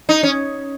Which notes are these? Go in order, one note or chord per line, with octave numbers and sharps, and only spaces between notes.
D#4
C#4